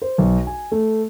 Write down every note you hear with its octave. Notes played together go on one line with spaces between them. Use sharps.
C5
B1
G#5
A3